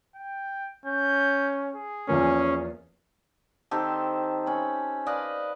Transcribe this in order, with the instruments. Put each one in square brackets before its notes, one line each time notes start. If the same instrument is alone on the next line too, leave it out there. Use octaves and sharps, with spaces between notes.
[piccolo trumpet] G5
[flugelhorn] C#4 [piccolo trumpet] G6
[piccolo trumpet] G#4
[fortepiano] E2 F3 A#3 [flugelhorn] C#4
[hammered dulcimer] D#3 C4 G4 A4
C#4 B5
B4 D5 D#5 F5